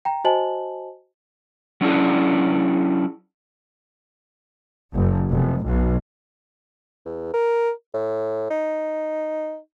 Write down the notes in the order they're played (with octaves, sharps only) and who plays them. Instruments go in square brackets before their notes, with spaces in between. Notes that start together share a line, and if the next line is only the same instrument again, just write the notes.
[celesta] G5 A#5
F#4 C5 D#5 G#5 A5 F#7
[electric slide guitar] F#3 C#4 D4 E4 G#4
[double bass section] F#1
F1
B1
[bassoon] E2
A#4
A2
D#4